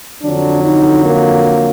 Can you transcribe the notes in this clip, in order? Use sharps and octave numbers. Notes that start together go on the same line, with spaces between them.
F2 D3 F#3 D4
D#4
A#3